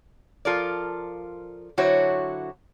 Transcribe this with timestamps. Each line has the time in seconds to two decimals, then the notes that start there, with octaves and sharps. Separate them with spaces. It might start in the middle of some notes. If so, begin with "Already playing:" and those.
0.45 F3 F4 A4 A#4 D5
1.77 D3 F#3 E4 F#4 C5 C#5